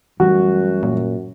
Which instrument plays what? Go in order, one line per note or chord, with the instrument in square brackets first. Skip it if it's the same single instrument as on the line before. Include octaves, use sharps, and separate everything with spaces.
[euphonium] F#2 [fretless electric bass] E3 G3 A3 [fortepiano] F#4
[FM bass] A#2